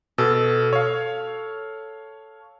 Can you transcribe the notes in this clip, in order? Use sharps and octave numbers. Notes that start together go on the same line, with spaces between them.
B2 A4
C#5 F5